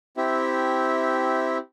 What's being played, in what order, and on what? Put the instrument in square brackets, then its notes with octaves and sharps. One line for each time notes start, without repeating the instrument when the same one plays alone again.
[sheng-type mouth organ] C4 E4 G4 E5